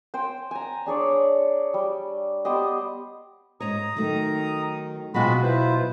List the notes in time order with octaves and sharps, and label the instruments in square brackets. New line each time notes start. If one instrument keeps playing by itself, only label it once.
[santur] C5 G5 G#5
G#5 A#5
D4 G#4 C#5 D5
G3
B3 G4 C5 D#5
[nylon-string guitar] G#2 C#5 [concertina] A#5 D#6
[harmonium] D#3 D#4 [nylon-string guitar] F#3 A3
[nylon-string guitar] B2 F#3 [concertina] G#3 F#4 B5 [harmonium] C4 F4
[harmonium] E4 F4 B4 [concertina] C5